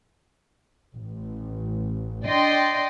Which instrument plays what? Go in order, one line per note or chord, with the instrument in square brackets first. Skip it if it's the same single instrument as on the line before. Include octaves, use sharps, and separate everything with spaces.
[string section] A1
D4 D5 D#5 G5 C6